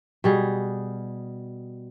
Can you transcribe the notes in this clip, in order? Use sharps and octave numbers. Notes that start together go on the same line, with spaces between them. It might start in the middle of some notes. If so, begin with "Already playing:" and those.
B2 G3 G#4